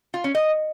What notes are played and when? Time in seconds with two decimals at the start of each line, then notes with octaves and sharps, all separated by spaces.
0.14 F4
0.24 C#4
0.35 D#5